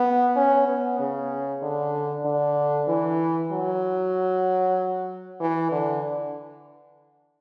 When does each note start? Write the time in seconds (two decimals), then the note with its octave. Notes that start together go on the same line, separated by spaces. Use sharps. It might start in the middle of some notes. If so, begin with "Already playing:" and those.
Already playing: B3
0.36 C#4
0.68 B3
0.99 C#3
1.62 D3
2.25 D3
2.88 E3
3.52 F#3
5.40 E3
5.72 D3